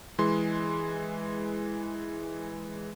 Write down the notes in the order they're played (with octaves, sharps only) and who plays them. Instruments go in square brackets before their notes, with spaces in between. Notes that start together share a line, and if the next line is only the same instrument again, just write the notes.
[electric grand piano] E3 G#3 C6